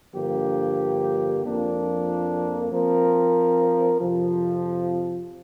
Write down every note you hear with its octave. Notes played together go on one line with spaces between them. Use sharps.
G2 D3 F3 A#3 G4
F2 F3 A#3 D4
F3 C4 A#4
F2 C3 F3